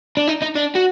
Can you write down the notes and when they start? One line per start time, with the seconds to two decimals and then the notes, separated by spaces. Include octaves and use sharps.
0.17 D4
0.28 D#4
0.42 D#4
0.56 D4
0.76 F#4